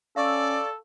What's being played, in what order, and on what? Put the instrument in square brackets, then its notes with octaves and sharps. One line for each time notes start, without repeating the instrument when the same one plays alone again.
[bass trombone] C#4 [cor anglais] A4 [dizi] D5 [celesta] F5 C#6 E6